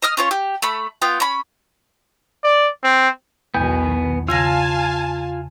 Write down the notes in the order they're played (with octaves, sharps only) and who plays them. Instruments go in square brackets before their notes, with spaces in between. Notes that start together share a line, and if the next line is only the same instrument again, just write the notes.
[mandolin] D#5 D#6 F6
C#4 F4 C#5
G4
A3 B5
B3 F4 G5
C#4 B5
[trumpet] D5
C4
[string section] B1 B2 D#3 [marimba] E2 [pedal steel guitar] B3 G#5
[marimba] C#3 G#6 A#6 [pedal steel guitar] F4 [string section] F5 G#5 A5